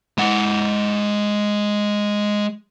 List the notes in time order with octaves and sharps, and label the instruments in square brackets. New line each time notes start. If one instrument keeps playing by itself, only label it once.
[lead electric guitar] G#3 F#5